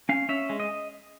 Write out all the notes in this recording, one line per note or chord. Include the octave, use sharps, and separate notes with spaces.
C#4 F5
C#4 E5
G#3
D#5